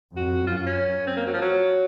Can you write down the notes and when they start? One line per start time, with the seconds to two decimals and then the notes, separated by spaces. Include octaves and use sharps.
0.16 F2 F#4
0.46 F#2 F4
0.56 F4
0.66 C#4
1.07 C4
1.16 A#3
1.26 F#3
1.33 F3
1.41 F#3